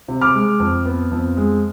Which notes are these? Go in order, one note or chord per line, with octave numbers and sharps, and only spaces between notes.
C3
D6 F6
G#3
F2
B3
F2
G#3